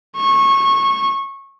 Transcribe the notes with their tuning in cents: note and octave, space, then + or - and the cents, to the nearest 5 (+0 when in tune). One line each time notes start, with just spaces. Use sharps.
C#6 -20